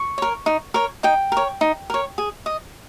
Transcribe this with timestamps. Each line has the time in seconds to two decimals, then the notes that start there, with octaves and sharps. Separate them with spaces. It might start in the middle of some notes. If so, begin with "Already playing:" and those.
Already playing: C#6
0.18 A#4 C#5
0.46 D#4
0.74 A#4 C#5
1.03 D#4 G5
1.32 A#4 C#5
1.61 D#4
1.90 A#4 C#5
2.18 G#4
2.46 D#5